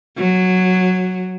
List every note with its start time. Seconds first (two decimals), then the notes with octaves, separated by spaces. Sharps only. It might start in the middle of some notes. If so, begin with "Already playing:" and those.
0.17 F#3